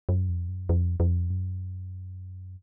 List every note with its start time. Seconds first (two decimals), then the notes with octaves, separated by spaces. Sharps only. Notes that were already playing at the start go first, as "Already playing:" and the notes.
0.09 F#2
0.29 F2
0.49 F#2
0.69 F2
1.00 F2
1.30 F#2